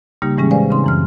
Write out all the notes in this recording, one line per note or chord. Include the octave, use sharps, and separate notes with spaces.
C#3 G3 A#3 D#4 G4
A2 E3 G3 G#3 C#4 G#4
B4 C5 D5 F5 G#5
C#3 C4 D#4 C6
F#2 E3 F6